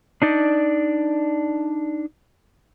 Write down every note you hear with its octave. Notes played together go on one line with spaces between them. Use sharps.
D4 D#4 D5